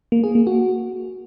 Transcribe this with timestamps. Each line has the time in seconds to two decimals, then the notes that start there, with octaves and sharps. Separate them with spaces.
0.12 A#3
0.24 G#4
0.35 A#3
0.47 F#4